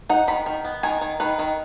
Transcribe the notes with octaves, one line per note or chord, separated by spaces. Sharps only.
D#4 F#5
D#3 B5
D#3
B3
D#3 G#5
D#3
D#3 B4
D#3